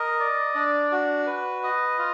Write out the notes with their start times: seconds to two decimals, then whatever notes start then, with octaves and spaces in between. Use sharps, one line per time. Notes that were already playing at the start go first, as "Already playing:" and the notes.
Already playing: A#4 D#5
0.20 D5
0.55 D4
0.92 F#4
1.27 B4
1.63 D#5
1.99 F4